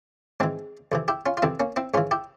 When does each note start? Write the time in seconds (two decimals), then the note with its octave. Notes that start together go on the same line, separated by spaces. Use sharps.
0.40 G#2 E3 G#3 C4
0.92 F2 C3 E3
1.08 E4 G4
1.26 C#4 F4
1.37 F4
1.42 F2 C3 E3 C4 E4
1.60 A#3 C#4
1.76 C4 E4
1.94 G#2 E3 C#4 F4
2.11 E4 G4